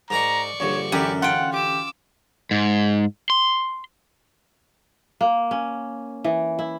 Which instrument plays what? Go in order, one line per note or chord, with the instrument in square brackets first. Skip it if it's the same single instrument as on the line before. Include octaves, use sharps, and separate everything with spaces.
[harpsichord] G#2 A#4 D6 [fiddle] D5 C#6 [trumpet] A#5
[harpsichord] A#1 G2 D3 [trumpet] C#5
[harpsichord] A1 D3 E4 [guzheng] F#2 [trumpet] G4
[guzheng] F4 G5 [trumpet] F#5
[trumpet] G4 [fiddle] D6 E6
[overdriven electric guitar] G#2
C6
[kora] A#3
C#4
E3
E4